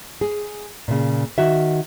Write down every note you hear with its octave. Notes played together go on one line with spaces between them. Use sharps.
G#4
A#2 C#3
D#3 F#4 E5